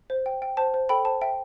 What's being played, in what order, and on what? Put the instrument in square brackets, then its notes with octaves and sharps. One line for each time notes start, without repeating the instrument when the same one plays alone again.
[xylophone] C5
G5
G5
C5 A5
C5
A4 G5 B5
C5 A5
E5 G5